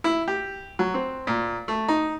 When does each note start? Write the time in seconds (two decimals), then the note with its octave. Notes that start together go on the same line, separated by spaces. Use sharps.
0.04 E4
0.28 G4
0.79 F#3
0.94 C4
1.27 A#2
1.68 A3
1.88 D#4